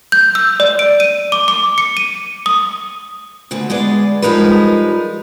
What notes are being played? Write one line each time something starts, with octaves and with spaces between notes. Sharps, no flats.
G6
E6
D5
D7
D#7
D6
D6
C#7
D#7
D#6
D2 B2 D3
G#3 B3 G#4 D5
F3 G3 G#3 D#4 A#4 B4